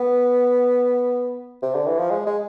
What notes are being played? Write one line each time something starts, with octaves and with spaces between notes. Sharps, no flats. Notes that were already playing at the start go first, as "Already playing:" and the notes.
Already playing: B3
C3
D3
E3
F3
G#3
G#3